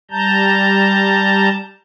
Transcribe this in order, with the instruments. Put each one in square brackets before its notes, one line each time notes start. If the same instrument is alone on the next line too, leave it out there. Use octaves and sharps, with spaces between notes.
[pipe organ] G3 A5 A#5 G6